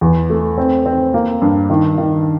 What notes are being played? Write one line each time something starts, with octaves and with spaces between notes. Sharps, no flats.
E2
A3
C4
C4
A#3
G2
D#3
D#3